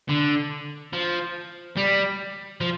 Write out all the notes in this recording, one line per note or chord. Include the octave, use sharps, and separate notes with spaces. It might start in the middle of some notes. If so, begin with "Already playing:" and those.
D3
F3
G3
F3